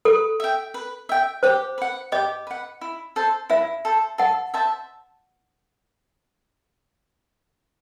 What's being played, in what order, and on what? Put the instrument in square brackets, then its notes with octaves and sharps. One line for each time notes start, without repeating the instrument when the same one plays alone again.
[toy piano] A4 [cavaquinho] B4
[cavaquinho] E5 G5
B4
E5 G5
[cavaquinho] G4 [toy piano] C5
[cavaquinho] B4 F#5
[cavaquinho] G4 [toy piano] D#5
[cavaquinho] B4 F#5
E4
A4 C5
[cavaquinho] E4 [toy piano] E5
[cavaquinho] A4 C5
[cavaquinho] A4 [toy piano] F#5
[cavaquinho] C5 E5 A5